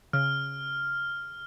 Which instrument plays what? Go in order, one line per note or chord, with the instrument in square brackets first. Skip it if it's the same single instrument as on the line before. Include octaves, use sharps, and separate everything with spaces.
[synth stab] C#3 [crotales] F6